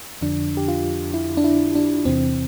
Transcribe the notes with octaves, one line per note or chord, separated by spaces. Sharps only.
F2 D3 F3 D4
G4
F4
E4
D4
E4
D4
E2 C3 E3 C4